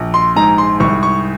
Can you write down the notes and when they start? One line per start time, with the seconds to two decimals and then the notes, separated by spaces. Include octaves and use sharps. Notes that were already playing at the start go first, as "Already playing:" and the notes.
Already playing: A#1
0.14 C6
0.36 G#2 A#5
0.58 C6
0.80 C2 C#6
1.03 C#6